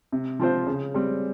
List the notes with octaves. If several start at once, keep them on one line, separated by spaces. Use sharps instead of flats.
C3
F3 C4 F4 C5
C#3
G3 C4